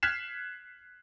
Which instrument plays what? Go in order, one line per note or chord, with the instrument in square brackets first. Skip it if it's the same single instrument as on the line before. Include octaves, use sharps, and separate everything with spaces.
[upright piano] F6 F#6 G#6 B6 C7 E7